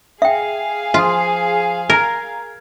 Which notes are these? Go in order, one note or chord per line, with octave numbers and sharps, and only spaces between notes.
G#4 E5 F5 G5
F3 F4 C6 D#6
A#4 A#5 F6 G#6